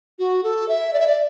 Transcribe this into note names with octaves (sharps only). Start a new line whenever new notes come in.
F#4
A4
E5
D5
E5
D5